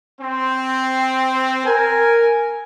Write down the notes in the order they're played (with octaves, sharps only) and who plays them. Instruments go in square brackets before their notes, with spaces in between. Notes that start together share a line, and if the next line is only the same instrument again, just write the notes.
[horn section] C4
[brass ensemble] A#4 [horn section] G#5